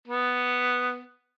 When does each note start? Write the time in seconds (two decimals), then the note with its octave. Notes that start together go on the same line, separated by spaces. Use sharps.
0.08 B3